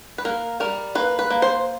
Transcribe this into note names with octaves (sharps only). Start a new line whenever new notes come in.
B4
A#3 A#4
G3 A#4
A#3 B4
B4
A#3
C5